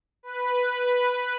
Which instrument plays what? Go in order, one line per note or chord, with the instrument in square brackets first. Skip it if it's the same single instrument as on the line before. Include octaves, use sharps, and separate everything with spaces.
[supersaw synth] B4